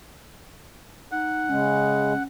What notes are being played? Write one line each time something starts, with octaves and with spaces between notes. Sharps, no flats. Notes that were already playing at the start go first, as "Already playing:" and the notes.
D#4 F#5
C#3 G#3 C#4